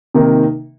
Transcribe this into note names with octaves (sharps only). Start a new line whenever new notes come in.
C3 D#3 A#3 D#4